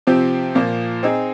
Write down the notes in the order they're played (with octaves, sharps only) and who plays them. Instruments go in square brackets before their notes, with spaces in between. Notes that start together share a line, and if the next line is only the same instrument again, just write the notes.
[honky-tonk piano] C3 F3 C4 G4
A#2 F3 A#3
C4 D#4 G#4